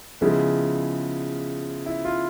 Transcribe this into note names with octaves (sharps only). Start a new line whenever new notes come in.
C#3 F3 G#3 B3 E4
E4
F4